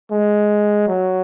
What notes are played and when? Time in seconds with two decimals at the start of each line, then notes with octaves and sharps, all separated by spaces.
0.11 G#3
0.88 F#3